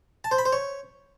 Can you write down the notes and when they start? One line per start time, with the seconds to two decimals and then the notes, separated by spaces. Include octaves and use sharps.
0.24 A5
0.31 C5
0.38 B5
0.45 C5
0.53 C#5